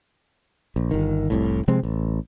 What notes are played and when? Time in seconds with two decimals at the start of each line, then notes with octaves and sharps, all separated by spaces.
0.76 A#1
0.91 G1 D#3
1.30 F1 C2 A2
1.68 C3 F3 G#3 C4
1.83 A1